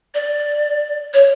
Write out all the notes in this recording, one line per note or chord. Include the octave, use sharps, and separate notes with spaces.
D5
C#5